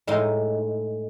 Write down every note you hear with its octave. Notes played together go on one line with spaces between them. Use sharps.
A2 G#3 D#4